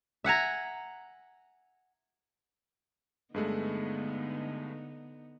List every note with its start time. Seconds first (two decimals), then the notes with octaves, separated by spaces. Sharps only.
0.24 E5 F#5 G#5 A#5
3.34 G2 D3 G#3 A3 B3 D#4